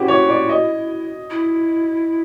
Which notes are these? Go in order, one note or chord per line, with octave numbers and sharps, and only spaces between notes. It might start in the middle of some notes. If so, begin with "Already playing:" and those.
Already playing: C4 C#4 E4 F#4 G4
C#5
D5
D#5
E4